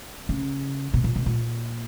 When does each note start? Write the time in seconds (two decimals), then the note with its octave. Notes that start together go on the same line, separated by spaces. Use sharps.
0.29 C#3
0.94 B2
1.04 A#2
1.16 B2
1.26 A#2